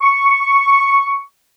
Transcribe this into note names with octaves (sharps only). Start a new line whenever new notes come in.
C#6